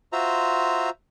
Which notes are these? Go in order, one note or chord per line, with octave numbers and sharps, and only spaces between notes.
F4 F#4 C5 E5 A#5